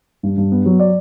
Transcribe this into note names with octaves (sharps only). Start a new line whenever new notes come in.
G2
G2
B3
F#3
D5